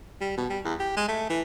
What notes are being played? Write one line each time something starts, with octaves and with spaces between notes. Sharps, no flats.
G3
B2
G3
E2
G4
G#3
A3
E3